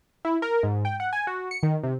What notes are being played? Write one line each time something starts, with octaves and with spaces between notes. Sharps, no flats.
E4
A#4
G#2
G5
F#5
G#5
F#4
C#7
D#3
C3